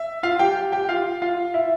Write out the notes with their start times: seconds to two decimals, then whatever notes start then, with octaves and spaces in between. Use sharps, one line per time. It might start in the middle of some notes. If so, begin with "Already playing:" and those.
Already playing: E5
0.23 F4 F5
0.39 G4 G5
0.72 G4 G5
0.89 F4 F5
1.22 F4 F5
1.54 E4 E5